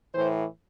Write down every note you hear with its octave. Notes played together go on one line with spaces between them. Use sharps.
A2 E3 C5